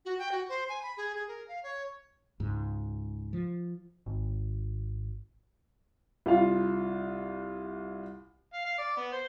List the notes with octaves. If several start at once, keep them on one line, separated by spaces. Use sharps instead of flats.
F#4
G5
F#4
C5
G#5
B5
G#4
G#4
A#4
F5
C#5
C#2 G#2
F3
G#1
C2 F4 F5
F5
F5
D5
B3
C5